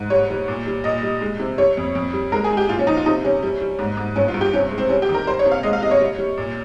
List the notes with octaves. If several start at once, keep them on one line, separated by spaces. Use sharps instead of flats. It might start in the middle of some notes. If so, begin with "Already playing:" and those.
Already playing: G#2
G3 C#5
G3
A#2
G3
A#2 D#5
G3
G#3
C3
G3 C#5
F2
F2
G3
G#3 A#4
G#4
G#3
G4
A#2 F4
C#4
F3 D#4
F4
C3 D#4
G3 C#4
G3
G3
G#2
G#2
G2 C#4
F4
G2
G4
C3 C#4
G#3
C4
G3 C#4
G4
D#3
A#4
G3 C5
C#5
C3
F5
G#3 D#5
F5
C3 D#5
C#5
G3
G3
A#2